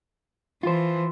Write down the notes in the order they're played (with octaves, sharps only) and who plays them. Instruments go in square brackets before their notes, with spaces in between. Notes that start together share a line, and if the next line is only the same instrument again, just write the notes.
[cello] E3 [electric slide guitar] F4 C5